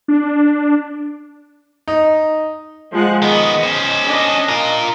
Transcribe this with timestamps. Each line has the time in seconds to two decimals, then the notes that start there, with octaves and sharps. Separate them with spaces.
0.08 D4
1.87 D#4
2.91 F3 G#3 F#5
3.22 D#3 B3 D#5
3.63 C#4 C5
4.06 D4 D#5
4.49 F4 A#4